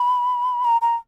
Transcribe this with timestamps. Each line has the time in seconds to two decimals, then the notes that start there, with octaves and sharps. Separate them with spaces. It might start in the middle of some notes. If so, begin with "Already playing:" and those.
Already playing: B5
0.64 A#5
0.82 A#5